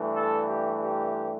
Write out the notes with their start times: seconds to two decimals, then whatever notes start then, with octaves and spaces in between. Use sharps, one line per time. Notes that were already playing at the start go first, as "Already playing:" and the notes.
Already playing: G2 E3 A3
0.15 A4
0.48 G4
0.83 G4